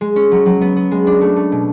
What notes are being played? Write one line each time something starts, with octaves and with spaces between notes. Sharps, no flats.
G#3
C#4
F#3
F#3
B3
B3
G#3
D4
A3
A3
B2